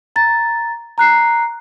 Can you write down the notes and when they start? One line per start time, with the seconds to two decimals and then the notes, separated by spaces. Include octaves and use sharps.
0.16 A#5 A6
0.98 A#5 F#6 C7